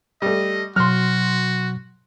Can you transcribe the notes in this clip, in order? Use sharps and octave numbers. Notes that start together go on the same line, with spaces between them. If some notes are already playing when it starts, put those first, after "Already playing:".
G3 A3 D#5
B2 F#3 F#4 C6 F6